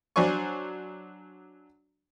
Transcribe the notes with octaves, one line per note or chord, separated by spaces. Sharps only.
F#3 D4 C5 G#5 C#6